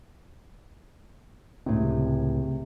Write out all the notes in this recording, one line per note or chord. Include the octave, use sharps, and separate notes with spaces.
C#2 A2 C3